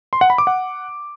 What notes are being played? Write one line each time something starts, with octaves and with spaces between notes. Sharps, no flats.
C6
F#5
B5
D6
F#5